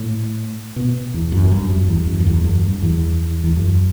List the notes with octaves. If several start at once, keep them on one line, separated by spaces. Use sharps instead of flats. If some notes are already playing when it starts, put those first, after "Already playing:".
Already playing: A2
B2
E2
F#2
G2
F#2
E2
F#2
F#2
E2
F#2
G2
E2
E2
F#2